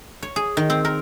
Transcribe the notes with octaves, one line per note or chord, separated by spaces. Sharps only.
C#5
G#4
D#3
C4
A#4